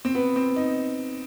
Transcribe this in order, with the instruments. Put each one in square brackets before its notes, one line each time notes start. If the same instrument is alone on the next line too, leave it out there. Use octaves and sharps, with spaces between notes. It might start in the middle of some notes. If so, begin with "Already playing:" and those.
[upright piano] C4
B3
C4
D#4